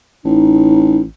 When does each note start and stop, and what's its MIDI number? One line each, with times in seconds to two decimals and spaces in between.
0.25 1.04 33
0.25 1.00 63